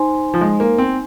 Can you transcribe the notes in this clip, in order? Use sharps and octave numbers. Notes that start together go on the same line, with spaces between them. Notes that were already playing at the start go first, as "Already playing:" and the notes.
Already playing: D#4 C5 G#5 C6
F3
G#3
A#3
C4